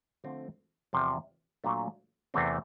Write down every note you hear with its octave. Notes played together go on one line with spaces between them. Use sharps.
D3 F3 A3 C4
E2 C3 F3
A#2 F#3 A3 D4
E2 C3 E3 A3 C4